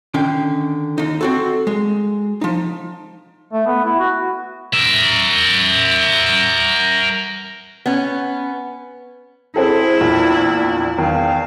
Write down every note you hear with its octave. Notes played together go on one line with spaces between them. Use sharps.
D3 D#3 C#4 G5
D#2 D#4
C4 F#4 A4
G#3
F3 D#4
A3
B3
E4
F#4
A#4 E5
B3 C#4
C4 E4 G#4 A4
A#1 E2 A#2
E2 D#3 F5